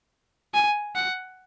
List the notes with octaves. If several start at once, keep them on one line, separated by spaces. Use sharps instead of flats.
G#5
F#5